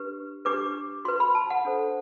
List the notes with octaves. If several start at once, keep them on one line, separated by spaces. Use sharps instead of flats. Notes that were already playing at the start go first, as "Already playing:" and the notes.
Already playing: D4 G4 B4
D4 G4 B4 D6
F#4 B4 C6
B5
A5
F#5
D4 A4 C5